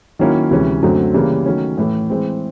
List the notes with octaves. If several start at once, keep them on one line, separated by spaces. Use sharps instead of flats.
D#3 F#3 A#3 C#4 E4
D2 C3 E3 G#3 C#4
F#2 D3 F#3 A3 C4
C#3 E3 G3 A#3
D#3 F#3 A3 C#4
A2 E3 A3
E3 G#3 C4